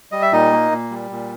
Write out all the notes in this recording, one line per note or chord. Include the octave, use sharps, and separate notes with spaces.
G3 D#5
E5
A#2 D#4 D#5
A#3
A#2
G3
A#2